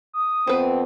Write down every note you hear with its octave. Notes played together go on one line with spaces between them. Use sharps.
D#6
F2 B3 C4 B4 C5